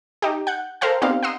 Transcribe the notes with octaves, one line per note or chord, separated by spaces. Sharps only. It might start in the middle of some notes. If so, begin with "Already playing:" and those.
D#4 G4
F#5 F#6 G6
A4 A#4 C5 F5 G5
B3 C4 D#4 G4 D5 F5
F#5 A#5 C6 D#6